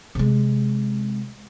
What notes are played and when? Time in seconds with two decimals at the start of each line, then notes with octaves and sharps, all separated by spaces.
0.15 C3 G#3